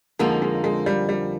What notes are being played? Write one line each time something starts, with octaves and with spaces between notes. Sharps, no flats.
F2 D3 F3 G#3 A#3 D#4
G#3
G#3
G3
G3